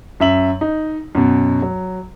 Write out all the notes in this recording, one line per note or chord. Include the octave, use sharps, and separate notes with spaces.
F#2 E5 F#7
D#4
F#2 B2
F#3